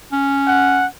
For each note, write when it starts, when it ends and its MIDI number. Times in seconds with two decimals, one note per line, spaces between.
0.12 0.85 61
0.47 0.86 78